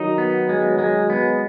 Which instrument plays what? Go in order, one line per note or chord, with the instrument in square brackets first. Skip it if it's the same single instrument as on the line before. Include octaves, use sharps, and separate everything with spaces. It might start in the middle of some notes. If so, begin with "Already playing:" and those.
Already playing: [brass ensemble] D#3 F#3 [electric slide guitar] D#4
[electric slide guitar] B3
G#3
G#3
B3